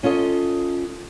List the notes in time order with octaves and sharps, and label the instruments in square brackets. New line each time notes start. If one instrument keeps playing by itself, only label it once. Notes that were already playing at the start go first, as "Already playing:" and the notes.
[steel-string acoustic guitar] C#4 F4 A4 D#5